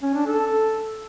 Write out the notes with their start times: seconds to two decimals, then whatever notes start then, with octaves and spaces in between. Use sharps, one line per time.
0.02 C#4
0.14 D4
0.26 A4